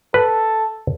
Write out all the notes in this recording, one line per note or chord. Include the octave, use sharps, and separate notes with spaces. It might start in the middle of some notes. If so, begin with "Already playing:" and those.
A4 B4